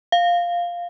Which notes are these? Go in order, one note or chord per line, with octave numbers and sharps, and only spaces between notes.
F5